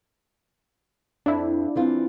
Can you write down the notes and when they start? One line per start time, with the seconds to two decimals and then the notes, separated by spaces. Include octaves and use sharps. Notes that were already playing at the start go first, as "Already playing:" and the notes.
1.26 F2 D4 E4
1.75 E3 C4 F4